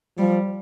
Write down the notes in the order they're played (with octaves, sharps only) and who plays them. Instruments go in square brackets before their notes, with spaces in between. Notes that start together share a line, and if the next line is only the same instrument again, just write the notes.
[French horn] F3 [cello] G3